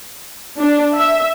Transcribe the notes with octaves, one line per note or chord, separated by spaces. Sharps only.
D4
E5